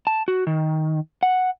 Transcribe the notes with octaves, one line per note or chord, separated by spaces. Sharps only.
A5
F#4
D#3
F#5